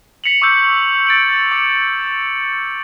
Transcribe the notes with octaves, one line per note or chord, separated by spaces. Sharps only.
B6 C#7 F7 F#7
C#6 D6 E6 G6 C#7
A6 D7 F#7
D6 C#7